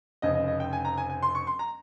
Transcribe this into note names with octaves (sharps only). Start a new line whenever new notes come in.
F1 F2 C#3 D#5
D#5
D#5
G5
G#5
A#5
G#5
G#5
C6
C#6
C6
A#5